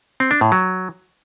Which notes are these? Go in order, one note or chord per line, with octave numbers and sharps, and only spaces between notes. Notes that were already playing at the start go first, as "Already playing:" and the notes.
C4
D4
A2
F#3